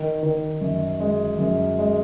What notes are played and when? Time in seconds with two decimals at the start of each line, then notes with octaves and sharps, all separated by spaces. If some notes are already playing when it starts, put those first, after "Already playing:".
Already playing: D#3
0.23 D#3
0.61 F#2
1.00 G#3
1.39 F#2
1.79 G#3